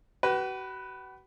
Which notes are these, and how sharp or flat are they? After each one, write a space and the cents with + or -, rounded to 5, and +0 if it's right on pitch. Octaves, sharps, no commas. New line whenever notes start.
F#4 +40 B4 +0